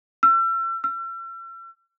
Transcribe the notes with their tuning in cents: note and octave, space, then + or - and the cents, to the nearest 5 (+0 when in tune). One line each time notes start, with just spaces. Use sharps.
E6 +40
E6 +45